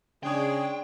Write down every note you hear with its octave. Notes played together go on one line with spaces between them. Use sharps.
C#3 G#3 D4 G#4 C#5 G5